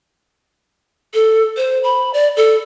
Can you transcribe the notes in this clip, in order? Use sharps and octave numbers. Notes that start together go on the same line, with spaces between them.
A4
C5
B5
D5
A4